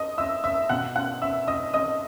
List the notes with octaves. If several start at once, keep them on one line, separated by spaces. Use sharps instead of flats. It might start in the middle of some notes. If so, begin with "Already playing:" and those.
Already playing: D#5 D#6
E5 E6
E5 E6
B2 F#5 F#6
F#5 F#6
E5 E6
D#5 D#6
D#5 D#6